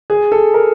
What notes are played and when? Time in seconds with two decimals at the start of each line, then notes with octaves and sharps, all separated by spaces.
0.10 G#4
0.32 A4
0.54 A#4